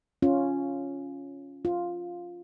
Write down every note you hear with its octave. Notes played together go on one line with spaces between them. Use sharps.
C#4 F4
F4